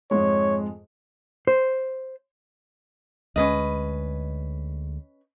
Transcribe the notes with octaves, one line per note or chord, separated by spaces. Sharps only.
F2 G#2 G#3 C#5
C5
D2 G#3 C#4 B4 D#5